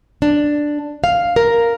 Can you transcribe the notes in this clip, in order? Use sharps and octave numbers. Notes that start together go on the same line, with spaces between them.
D4
F5
A#4